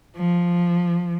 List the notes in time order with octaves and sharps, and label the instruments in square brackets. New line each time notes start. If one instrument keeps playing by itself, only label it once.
[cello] F3